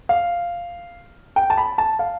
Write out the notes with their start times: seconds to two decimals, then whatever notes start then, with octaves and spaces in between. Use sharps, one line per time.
0.09 F5
1.36 G5
1.50 A5
1.57 B5
1.78 A5
1.99 F5